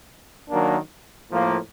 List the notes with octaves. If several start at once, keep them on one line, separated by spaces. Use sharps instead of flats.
D#3 F#3 A#3 D4
A2 F3 A#3